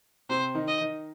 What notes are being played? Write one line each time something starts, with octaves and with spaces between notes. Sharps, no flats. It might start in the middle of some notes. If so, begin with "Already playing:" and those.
C3 C4 C5
D#3 D#4
D#5
D#3 D#4